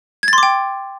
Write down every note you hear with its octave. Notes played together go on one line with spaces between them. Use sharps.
G5 C6 D6 G#6 A6